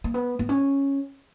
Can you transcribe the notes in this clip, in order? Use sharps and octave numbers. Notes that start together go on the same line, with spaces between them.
A#3
B3
B3
C#4